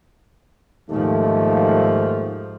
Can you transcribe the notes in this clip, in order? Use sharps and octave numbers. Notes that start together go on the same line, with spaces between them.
D#2 G#2 F3 A3